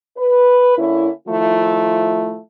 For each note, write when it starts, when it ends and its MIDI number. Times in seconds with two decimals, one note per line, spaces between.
0.17 0.77 71
0.78 1.10 50
0.78 1.10 58
0.78 1.10 61
0.78 1.10 64
1.28 2.40 51
1.28 2.40 53
1.28 2.40 57
1.28 2.40 64
1.28 2.40 65